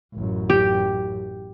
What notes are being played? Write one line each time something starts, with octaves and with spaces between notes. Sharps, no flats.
A1 F#2
G4